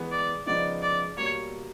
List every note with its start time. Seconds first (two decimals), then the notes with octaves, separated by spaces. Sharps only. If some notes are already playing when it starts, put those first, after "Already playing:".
Already playing: E3 G#3 B3
0.11 D5
0.46 C#3 F3 G#3 B3 D#4 D5
0.82 D5
1.17 B2 G3 A#3 C#5